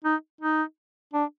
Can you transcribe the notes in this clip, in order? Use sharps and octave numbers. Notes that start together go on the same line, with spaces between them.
D#4
D#4
D4